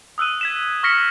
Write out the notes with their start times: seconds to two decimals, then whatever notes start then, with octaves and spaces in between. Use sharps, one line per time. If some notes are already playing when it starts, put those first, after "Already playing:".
0.18 D#6 E6 F#6 D#7
0.41 G#6 B6 E7
0.83 C#6 F6 A#6 B6 C#7 F#7